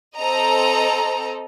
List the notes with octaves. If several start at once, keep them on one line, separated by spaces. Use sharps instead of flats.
C4 A4 C5 D#5 A#5